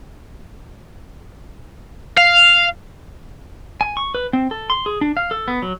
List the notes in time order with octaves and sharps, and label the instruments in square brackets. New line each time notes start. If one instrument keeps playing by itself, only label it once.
[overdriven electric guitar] F5
[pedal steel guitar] G#5
C#6
B4
C4
A4
C6
G#4
D4
F5
A4
B3
F#3